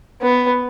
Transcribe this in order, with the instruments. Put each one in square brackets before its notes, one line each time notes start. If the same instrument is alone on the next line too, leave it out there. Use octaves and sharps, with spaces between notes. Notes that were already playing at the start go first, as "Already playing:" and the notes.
[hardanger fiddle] B3